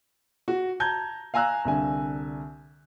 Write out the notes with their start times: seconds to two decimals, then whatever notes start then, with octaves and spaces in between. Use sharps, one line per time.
0.48 F#4
0.80 A5 A#5 G6 G#6
1.34 F5 G#5 A#5 E6 F#6
1.65 C2 D3 G#5